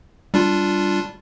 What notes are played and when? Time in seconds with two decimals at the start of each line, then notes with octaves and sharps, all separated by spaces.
0.34 G3 D4 F4